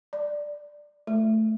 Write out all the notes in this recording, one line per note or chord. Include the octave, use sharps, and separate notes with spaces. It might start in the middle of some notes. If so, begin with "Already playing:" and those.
D5
A3